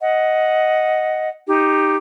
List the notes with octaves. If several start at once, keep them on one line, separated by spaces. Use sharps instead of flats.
D#5 F#5
D#4 G4